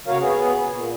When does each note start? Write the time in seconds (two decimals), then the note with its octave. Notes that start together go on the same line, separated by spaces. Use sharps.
0.07 C#3 A#3 F#4 A#4 C#5 F5
0.20 B3 G#4
0.70 A#2